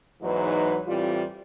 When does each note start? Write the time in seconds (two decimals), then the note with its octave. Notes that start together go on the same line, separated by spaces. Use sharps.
0.22 E2 G#2 E3 F#3 D#4 B4
0.87 A2 E3 G3 C4 F4